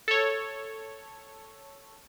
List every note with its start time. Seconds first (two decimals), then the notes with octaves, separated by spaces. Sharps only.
0.08 A4 C#5